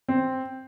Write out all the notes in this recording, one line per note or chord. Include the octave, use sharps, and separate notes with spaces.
C4